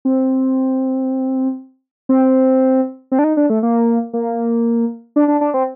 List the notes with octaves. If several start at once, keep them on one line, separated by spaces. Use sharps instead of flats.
C4
C4
C4
D4
D#4
D4
A3
A#3
A#3
D4
D4
D4
C4